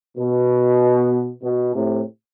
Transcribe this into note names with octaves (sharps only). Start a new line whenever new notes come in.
B2
B2
A2 C3